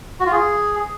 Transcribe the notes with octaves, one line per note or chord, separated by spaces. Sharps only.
F#4
F4
G#4